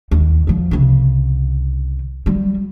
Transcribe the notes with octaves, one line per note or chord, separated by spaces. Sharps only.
D#2
E2 F3
C2 C#3
F#3 G3